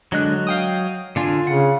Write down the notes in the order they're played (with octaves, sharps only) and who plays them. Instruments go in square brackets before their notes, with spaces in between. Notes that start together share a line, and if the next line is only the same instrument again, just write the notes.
[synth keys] D3 G#3 D4 [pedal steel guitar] F#3 D#5 F#6
[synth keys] F5 G5 D#6
[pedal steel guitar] D3 D4 G#5 [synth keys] F4
[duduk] C#3 [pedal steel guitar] F#5